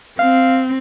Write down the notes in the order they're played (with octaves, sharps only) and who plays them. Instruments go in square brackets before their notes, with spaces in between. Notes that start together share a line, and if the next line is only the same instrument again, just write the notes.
[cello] C4 [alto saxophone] F5